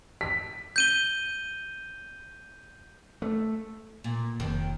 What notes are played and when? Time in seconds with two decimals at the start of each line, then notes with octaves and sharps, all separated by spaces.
0.21 B6
0.76 G6 D#7 G7
3.22 A3
4.04 A#2
4.40 F1 D#2 D#3